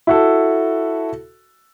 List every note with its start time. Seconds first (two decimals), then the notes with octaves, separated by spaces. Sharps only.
0.07 E4 F#4 A4